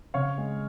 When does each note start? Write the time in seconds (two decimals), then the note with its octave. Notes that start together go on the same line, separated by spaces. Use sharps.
0.14 C#3 C#5 F5
0.38 G#3